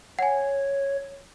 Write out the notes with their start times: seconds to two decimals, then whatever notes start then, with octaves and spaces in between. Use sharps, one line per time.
0.19 C#5 F#5 G#5